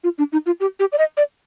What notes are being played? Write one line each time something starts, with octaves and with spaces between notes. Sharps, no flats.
F4
D4
D#4
F4
G4
G4
D5
D#5
D5